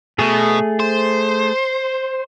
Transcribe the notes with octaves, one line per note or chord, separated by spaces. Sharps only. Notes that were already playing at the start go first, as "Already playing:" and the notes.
B2 A3 G#4
C5